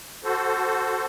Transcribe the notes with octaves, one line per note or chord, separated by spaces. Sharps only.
F#4 A4 C5